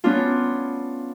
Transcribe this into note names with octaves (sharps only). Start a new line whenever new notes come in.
B3 C#4 D4 F4